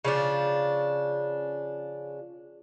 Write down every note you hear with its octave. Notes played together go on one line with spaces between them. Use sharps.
C#3 F3 D4